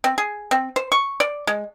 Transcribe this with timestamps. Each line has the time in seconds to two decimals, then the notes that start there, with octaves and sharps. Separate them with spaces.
0.04 C4
0.18 G#4
0.51 C4
0.76 C5
0.92 C#6
1.20 D5
1.47 G#3